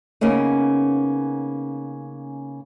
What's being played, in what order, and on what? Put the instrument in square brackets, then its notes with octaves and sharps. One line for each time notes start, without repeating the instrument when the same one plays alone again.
[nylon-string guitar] C#3 A#3 B3 C#4 D#4